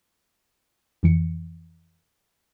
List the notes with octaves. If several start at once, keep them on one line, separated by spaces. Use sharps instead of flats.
F2 E3 C#7